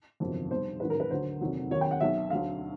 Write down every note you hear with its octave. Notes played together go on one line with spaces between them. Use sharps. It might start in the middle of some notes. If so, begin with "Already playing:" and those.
G1 F2 C3 D#3 F#3
B1 B2 G3 C5
A1 G#2 D#3 F#3 B4
A#4
B4
D2 D3 F#3 C5
F1 D#2 D#3 F#3
D#2 D#3 F#3 C#5
G5
F#5
B1 B2 F#3 E5
D2 D3 F#3 F5